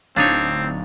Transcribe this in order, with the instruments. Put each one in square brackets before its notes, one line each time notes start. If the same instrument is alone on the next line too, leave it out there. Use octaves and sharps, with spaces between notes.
[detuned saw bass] D1 [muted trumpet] C4 [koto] D4 D#4 C#5 [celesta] F5 A6